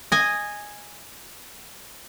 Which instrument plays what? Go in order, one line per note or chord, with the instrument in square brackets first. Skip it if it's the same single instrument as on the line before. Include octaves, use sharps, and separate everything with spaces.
[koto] D#5 G#5